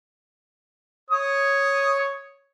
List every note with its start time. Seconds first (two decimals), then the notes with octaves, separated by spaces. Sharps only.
1.10 C#5 D#6